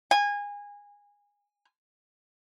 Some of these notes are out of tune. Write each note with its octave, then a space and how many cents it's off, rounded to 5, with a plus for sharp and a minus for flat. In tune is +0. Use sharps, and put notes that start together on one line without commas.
G#5 -25